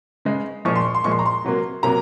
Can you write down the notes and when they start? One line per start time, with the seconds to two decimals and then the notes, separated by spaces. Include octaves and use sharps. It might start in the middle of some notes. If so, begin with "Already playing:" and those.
0.25 C#3 G#3
0.65 A#2 F3 G#3 C#6
0.76 C6
0.85 C#6
0.95 C6
1.04 A#2 F3 G#3 C#6
1.12 C6
1.19 A#5
1.26 C6
1.45 C3 F#3 A#3
1.83 C3 F#3 A#3 A#5